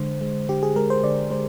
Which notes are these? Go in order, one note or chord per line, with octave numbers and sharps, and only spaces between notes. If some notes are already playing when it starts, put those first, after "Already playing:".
Already playing: D3 G#3 C5
G#3
D3 G4
G#4
G#3 A#4
C5
D3 D5
G#3 C5